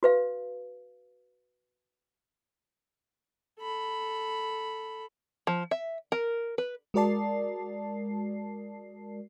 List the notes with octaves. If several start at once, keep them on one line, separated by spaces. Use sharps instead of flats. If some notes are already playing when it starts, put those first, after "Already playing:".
F#4 B4 F5
A4 B5
F3
E5
A#4
B4
G#3 F#4 A#4 D5 A5 C7